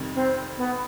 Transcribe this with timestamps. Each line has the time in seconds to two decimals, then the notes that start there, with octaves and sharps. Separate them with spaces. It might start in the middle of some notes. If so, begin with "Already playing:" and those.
Already playing: F2 C3 D#3 G3
0.15 C4
0.58 B3